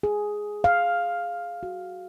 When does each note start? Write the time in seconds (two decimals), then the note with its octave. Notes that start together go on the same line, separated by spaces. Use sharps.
0.03 G#4
0.64 F5
1.63 F#4